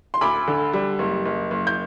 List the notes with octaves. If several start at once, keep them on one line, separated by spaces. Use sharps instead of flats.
C6
D2 B5 D6
D3
G3
F#1
F#1
F#1
G6